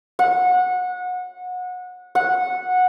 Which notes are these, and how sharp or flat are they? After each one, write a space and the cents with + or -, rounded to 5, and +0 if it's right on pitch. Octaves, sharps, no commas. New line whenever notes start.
F#5 -25
F#5 -15